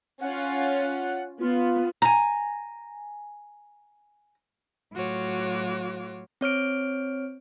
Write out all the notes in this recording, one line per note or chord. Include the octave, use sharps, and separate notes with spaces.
C#4 F4 F#5
B3 F4
G#5 A#5
A2 F#3 F4 F#4 C#5 D6
C4 C#5 F6 D7